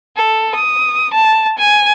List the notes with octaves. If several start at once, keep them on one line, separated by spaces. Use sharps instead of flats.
A4
D#6
A5
G#5